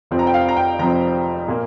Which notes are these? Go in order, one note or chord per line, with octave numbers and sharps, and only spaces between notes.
F1 F2 F3 C4
A#5
G5
F5
A#5
G5
F1 F2 F3 C4 A#5
A#2 A#3